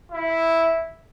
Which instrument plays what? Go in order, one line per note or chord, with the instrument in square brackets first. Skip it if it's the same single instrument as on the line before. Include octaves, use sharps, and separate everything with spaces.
[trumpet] E4